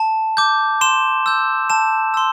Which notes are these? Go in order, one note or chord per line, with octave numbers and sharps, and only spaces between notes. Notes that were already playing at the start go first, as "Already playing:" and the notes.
Already playing: A5
D6 G6
C6 E7
E6 G6
A5 E7
C6 E6